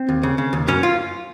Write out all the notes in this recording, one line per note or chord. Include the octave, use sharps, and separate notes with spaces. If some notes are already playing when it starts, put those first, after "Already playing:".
Already playing: C4
D#2
C#3
C#3
D#2
F#2 C#4
F4